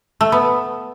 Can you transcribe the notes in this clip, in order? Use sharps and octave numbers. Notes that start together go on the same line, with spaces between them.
A3
B3